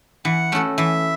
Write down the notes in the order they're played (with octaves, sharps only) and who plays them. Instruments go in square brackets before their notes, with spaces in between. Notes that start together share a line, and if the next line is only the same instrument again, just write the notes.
[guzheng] E3 [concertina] F#5
[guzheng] A3 C#4 F#4 A4
[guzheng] E3 [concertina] E5